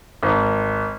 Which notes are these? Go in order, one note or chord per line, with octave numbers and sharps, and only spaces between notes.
G#1